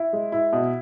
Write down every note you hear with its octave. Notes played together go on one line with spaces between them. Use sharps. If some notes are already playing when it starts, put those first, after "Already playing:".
Already playing: E4
G#3
E4
B2